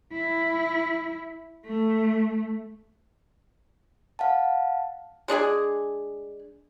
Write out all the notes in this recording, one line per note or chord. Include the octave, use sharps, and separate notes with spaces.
E4
A3
F5 F#5 A5
G#3 D4 G#4 G#5